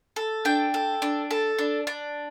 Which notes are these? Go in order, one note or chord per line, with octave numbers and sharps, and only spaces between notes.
A4
D4 G5
A4
D4
A4
D4
D4